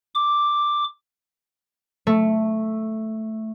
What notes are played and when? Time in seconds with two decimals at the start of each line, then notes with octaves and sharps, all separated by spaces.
0.15 D6
2.07 A3